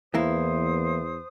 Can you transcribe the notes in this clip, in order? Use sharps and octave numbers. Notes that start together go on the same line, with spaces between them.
E2 E3 A#3 E4 C5 D#6